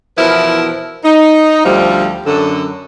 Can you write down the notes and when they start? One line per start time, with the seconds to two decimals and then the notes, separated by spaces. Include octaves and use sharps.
0.17 E2 B2 F3 E4 A#4 B4
1.04 D#4
1.65 D2 F3 G3
2.26 F#2 D3 A4